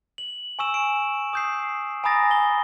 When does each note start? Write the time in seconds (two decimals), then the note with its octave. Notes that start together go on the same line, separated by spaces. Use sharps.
0.18 F#7
0.59 G#5 C#6 E6 E7
0.74 D7
1.33 D#6 G6 C7
2.04 G#5 A#5 B5 D#6 A6 A#6
2.31 G7